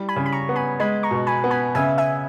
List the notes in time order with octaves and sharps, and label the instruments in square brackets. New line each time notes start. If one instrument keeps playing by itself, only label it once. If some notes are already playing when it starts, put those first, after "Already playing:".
Already playing: [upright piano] G3 E4
[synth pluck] G#5 B5
[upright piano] C#3
[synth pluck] B5
A#5 C#6
[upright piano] B3
[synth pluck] G#5 B5
[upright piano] G#3 [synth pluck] G#5 B5
[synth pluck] A#5 C#6
[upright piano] B2
[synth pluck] G#5 B5
[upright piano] B3
[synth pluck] G#5 B5
[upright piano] C#3 [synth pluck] E5 G#5
[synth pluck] E5 G#5